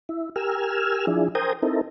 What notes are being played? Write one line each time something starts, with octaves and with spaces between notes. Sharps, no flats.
E4
G4 A#4 G#5 E6 F6
F3 D4 E4 G#4
A#4 C5 G5 G#5 A#5 D#6
C4 D#4 E4 A4 A#4